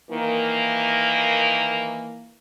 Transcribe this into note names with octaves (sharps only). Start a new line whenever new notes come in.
D#3 E3 A#3